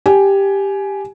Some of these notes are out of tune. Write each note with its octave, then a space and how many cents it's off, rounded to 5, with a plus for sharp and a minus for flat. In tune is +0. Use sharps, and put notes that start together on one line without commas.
G4 +5 G#5 +15